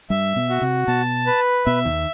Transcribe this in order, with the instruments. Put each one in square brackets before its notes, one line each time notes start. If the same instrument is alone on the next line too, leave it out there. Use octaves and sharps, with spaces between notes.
[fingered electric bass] G2 G3 [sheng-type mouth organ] E5
[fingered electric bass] B2 B3
[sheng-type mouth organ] F#4
[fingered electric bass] C3 C4
[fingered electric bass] B2 B3 [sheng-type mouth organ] A5
[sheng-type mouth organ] B4
[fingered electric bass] B2 B3 [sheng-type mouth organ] E5
[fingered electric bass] D#2 D#3